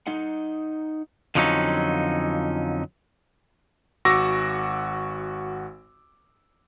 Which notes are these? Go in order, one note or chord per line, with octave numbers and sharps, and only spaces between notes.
D#4 D#5 F#5
F2 D3 F3 F#3 C#4 D#4
G#1 F#4 C#6 D6 E6 A#6